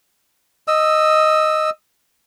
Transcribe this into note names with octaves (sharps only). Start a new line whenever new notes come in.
D#5 E6